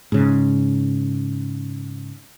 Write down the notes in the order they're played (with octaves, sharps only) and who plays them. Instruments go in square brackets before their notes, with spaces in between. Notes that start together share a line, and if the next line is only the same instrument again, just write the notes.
[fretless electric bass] G#2 C#3